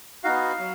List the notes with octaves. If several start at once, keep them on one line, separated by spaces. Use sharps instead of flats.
B3 D#4 F#4 F5
F#3